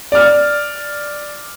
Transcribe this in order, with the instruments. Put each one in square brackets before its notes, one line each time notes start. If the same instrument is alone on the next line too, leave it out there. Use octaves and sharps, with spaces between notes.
[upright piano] D5 F6